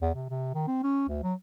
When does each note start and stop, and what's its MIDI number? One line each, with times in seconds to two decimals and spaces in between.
0.02 0.10 40
0.15 0.27 48
0.30 0.51 48
0.55 0.63 51
0.67 0.80 60
0.83 1.05 61
1.09 1.20 38
1.23 1.34 54